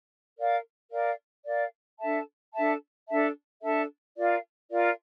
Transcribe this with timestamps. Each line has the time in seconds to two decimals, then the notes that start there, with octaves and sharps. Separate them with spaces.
0.36 A#4 D5 F5
0.90 A#4 D5 F5
1.44 A#4 D5 F5
1.98 D4 A4 E5 A5
2.53 D4 A4 E5 A5
3.07 D4 A4 E5 A5
3.61 D4 A4 E5 A5
4.15 F4 A#4 D5 F5
4.69 F4 A#4 D5 F5